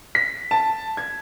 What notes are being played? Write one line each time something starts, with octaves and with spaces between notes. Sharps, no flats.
B6
A5
G#6